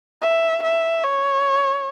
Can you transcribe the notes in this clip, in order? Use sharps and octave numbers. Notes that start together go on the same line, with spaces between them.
E5
E5
C#5